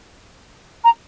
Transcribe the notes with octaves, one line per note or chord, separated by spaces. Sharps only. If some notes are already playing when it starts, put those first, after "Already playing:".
A#5